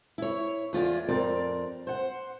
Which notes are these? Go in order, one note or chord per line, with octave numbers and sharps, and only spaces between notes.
E4 C#5
E2 F4 G#4 D5
F2 C4 A#4 D5
C5 F#5